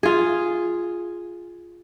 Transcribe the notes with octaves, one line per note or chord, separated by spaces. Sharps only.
F4 G#4